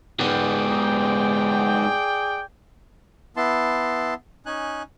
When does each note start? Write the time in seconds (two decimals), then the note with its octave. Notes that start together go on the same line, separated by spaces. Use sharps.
0.20 G#2 B3 G#4 D5 G5
3.37 B3 E4 A5 C6
4.46 C#4 D#4 G#5 F#6